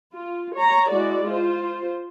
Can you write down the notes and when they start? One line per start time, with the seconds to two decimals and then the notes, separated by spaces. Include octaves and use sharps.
0.14 F4
0.57 C#5 A#5
0.90 G#3 E4 F#4 D5
1.28 F4 C5